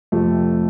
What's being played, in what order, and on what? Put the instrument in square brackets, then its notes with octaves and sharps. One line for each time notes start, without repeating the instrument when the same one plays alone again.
[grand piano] F2 C3 F3 A3